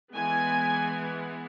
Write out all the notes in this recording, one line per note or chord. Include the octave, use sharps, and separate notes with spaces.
E3 G#3 B3 G#5